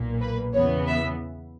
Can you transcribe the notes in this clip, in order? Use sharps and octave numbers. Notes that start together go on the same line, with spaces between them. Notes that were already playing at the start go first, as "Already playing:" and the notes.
Already playing: B1 A#2 A#3
B4
E2 C#3 E3 B3 C#5
E5